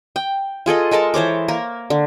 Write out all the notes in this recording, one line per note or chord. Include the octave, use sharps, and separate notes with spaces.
G5
F4 G#4 A4 D#5
G#3 A4 A#4 A5
E3 C5 C#5 D6
A#3 A#4
D3